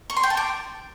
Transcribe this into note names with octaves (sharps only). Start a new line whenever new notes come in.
C#6
C6
G5
A5
D6